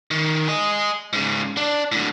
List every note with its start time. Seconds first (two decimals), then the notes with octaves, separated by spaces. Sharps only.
0.11 D#3
0.48 G#4 D#5
1.13 G#2 C#3
1.57 D4
1.92 A2 D3